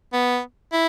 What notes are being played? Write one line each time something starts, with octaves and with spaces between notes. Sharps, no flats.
B3
E4